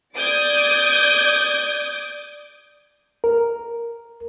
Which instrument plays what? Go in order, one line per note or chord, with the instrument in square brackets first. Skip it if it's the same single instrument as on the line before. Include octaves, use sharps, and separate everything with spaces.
[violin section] D5 D6 D#6 G6 G#6
[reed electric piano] A#4